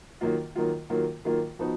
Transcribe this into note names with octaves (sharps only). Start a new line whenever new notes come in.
D#3 F#3 A#3 F4
D#3 F#3 A#3 F4
D#3 F#3 A#3 F4
D#3 F#3 A#3 F4
F3 B3 D#4 F#4